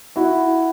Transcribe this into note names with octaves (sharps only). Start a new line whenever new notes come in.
E4 F#4